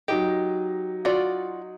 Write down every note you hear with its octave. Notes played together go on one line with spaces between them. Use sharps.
F#3 D#4 G4 D#5
F4 F#4 D5